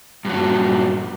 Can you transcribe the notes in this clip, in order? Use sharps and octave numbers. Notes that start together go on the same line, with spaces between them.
G2 A#2 F#3